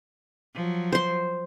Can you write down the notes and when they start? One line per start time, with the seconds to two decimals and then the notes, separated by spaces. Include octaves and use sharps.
0.54 F3 F#3
0.92 C5 C6